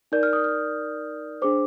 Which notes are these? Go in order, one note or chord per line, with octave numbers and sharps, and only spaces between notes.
D#4 A#4 D5 G6
F6
D#6
F6
D4 G#4 C5 D6